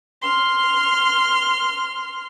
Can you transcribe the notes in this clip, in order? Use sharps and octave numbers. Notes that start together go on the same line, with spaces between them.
C6 F6